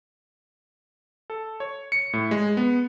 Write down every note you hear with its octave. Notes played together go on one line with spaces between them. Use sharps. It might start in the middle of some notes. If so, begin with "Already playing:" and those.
A4
C#5
C#7
A2
G#3
B3